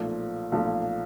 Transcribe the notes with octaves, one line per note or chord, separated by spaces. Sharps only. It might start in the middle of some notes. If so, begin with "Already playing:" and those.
Already playing: B1 A#2 F3 A3
B1 A#2 F3 A3